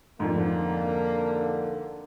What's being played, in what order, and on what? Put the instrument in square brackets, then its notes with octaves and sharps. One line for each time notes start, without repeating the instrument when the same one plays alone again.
[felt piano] F2 G#2 [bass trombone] D3 [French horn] A#3